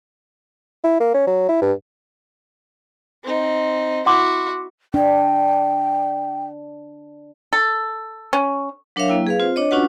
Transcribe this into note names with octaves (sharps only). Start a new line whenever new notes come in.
E4
A#3
C#4
F#3
E4
G2
C4 D#4
E4 F#4 F#5 C6 D6
D4 G5
A4
C#4
F#3 D4 A#4 C#5 E5 F5
F#3 A#3 E4 G5
G#4 B4 F5
C4 F4 C5
D4 C#5 D#5
C#4 D4 F4 F#4 B4 F#5